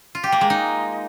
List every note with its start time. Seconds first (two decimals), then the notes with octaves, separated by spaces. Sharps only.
0.15 F4
0.24 G4
0.32 A#3
0.41 G#3
0.50 D#4